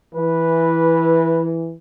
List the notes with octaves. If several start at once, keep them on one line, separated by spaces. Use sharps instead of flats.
E3 B4